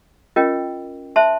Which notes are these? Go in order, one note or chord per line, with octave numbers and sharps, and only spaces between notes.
C#4 F4 A#4 D#5 G5
C5 E5 A5 C6